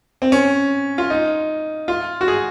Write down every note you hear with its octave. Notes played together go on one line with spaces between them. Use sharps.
C4
C#4
F4
D#4
F4
F#4
G#4